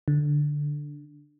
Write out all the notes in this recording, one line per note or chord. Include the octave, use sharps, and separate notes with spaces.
D3